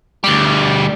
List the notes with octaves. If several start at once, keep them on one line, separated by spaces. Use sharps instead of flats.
D2 G3